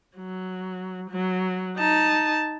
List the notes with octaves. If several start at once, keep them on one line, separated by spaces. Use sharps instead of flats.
F#3
F#3
D#4 A5